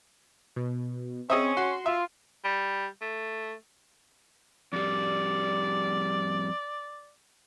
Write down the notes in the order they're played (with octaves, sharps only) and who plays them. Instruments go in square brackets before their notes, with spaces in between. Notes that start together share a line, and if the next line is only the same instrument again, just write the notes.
[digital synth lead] B2
[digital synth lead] C4 [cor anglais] C#4 [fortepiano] G#4 D#5 E5
[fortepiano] F#4 [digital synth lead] C6
[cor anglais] F4 [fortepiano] E5
[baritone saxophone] G3
A3
[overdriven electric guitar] F2 G3 [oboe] D5